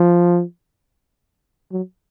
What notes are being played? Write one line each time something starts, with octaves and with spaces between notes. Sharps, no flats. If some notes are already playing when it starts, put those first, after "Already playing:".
Already playing: F3
F#3